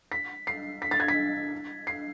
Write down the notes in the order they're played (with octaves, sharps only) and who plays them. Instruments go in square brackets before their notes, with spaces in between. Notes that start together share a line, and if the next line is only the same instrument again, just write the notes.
[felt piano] B6
C7
B6
A6
G#6
B6
C7